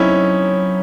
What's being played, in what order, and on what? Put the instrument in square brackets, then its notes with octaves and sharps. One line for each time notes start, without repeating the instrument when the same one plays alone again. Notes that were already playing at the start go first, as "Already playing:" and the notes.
Already playing: [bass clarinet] F#3 [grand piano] C4 C#4 D#4 E4